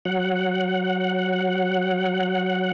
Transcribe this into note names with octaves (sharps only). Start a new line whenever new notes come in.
F#3 F#5